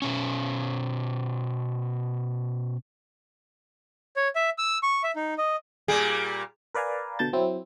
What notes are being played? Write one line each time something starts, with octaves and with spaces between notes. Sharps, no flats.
B2 C#4
C#5
E5
E6
C#6
E5
D#4
D#5
A#2 G3 A#3 G#4
A#4 B4 D5 F5 G#5 A#5
B2 D3 A5 G6 A6
F#3 C4 E4